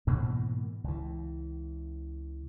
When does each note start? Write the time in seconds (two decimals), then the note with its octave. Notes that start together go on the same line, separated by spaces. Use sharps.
0.07 G#2 B2 E3 A#3
0.84 C#2 E3